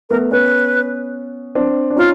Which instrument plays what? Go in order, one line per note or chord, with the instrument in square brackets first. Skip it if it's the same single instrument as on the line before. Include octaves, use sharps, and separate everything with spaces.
[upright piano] A3 B3 [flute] A#4
[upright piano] B3 C#4 [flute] B4
[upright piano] C4 D4
D4
[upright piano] C#4 D#4 [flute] F4